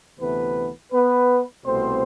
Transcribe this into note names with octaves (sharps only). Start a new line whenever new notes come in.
D2 C3 E3 A3 B3 B4
B3 B4
C2 B2 A3 C4 C5